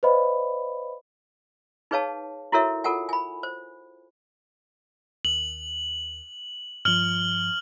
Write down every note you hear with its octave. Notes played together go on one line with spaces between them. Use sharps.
B4 C5 D5 D#5 F5 B5
D#4 G#4 B4 C#5 F5 A5
E4 F#4 A4 A#4 C#5 E5
F4 A4 A#4 F#5 G#5
G#5 B5
C5
D#2 F#7
G2 F3 F6 F#7